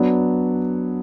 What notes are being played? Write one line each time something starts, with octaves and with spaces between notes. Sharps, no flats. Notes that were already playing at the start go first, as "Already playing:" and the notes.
Already playing: F#3 B3 D4